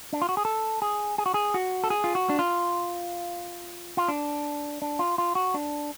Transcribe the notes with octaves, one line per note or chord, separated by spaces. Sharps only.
D4
F4
F#4
G#4
A4
G#4
G#4
F#4
G#4
F#4
A4
G#4
F4
F#4
D4
F4
F4
D4
D4
F4
F4
F#4
D4